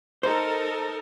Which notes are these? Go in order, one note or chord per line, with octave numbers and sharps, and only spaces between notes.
D#4 A4 A#4 C5